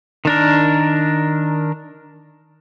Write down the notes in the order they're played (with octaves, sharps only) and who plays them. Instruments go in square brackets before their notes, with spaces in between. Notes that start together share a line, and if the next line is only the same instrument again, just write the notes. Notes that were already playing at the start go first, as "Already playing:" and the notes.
[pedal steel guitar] D#3 D4 A#4